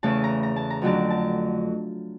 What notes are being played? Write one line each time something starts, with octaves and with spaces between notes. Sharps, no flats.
E2 C#3 E3 A3 A5
A#5
A#5
A5
A#5
F2 D3 F#3 A3 A5
A5